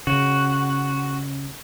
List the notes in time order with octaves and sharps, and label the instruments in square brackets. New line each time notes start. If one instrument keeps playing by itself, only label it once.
[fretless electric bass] C#3 [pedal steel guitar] F#4